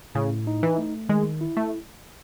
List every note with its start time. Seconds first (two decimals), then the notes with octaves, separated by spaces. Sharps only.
0.15 A2 C#3
0.47 D#4
0.63 E3
0.78 A3
1.09 D#3 G#3
1.41 E4
1.57 A3